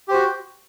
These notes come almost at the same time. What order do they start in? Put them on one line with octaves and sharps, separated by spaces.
G4 C5 F#4